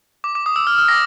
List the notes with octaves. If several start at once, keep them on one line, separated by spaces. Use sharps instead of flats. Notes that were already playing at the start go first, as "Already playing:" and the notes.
D6
D6
D#6
E6
F6
F6
A#6